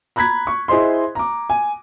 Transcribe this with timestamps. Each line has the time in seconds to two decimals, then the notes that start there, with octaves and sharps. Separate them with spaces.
0.16 A#5 B5 F#6 G#6 B6
0.47 C#6
0.68 E4 G#4 C5 D#5 C6
1.15 A#5 D6
1.50 G#5